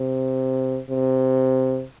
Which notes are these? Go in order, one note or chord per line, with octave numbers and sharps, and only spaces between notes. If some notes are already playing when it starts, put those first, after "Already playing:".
Already playing: C3
C3